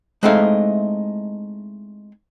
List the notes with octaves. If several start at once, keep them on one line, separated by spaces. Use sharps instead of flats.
G#3 A3 C4 D#4 E4 F5